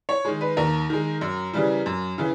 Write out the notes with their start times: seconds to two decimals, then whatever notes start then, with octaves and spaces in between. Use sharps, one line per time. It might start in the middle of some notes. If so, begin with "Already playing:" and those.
0.09 C#5
0.25 D#3 G#3
0.41 B4
0.57 D#2 A#4
0.90 D#3 G#3
1.21 F#2
1.54 C#3 E3 G3
1.86 F#2
2.18 C#3 E3